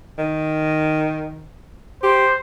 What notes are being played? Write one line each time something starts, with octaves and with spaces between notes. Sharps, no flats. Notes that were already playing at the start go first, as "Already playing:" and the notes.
D#3
G4 C5